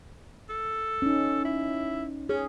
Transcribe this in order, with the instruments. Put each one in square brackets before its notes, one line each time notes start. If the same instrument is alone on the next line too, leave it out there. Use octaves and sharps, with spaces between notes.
[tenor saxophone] A4
[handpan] C#4 D#4
[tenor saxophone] E4
[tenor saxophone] C#4 [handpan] G#4